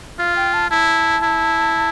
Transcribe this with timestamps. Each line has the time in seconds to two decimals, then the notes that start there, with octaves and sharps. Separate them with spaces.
0.18 F4 F5
0.36 G5
0.53 A5
0.70 E4 A5
1.23 E4